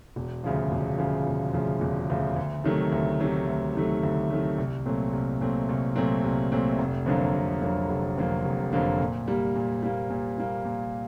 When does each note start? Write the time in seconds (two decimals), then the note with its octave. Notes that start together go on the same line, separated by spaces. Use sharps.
0.16 E1
0.44 D2 C#3 F3
0.72 E1
0.99 D2 C#3 F3
1.26 E1
1.54 D2 C#3 F3
1.81 E1
2.09 D2 C#3 F3
2.36 D2
2.64 C3 D#3 F#3 A3
2.92 D2
3.20 C3 D#3 F#3 A3
3.47 D2
3.75 C3 D#3 F#3 A3
4.03 D2
4.30 C3 D#3 F#3 A3
4.58 C2
4.86 A#2 F#3 A3 C4
5.13 C2
5.41 A#2 F#3 A3 C4
5.69 C2
5.96 A#2 F#3 A3 C4
6.24 C2
6.52 A#2 F#3 A3 C4
6.79 F1
7.06 F2 D3 F#3 A#3
7.35 F1
7.62 F2 D3 F#3 A#3
7.89 F1
8.18 F2 D3 F#3 A#3
8.45 F1
8.73 F2 D3 F#3 A#3
9.00 A#2
9.27 G3 A#3
9.56 A#2
9.83 G3 A#3
10.10 A#2
10.38 G3 A#3
10.65 A#2